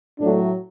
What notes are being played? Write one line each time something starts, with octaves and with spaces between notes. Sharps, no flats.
A2 F#3 A3 D4